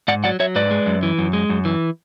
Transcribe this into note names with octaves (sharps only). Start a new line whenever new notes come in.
G#2 D5 F#5
F#3 D5 F#5
F#3 C#5 E5
G#2 B4 D5
G#3
F#2
E3
F#2
G#3
F#2
E3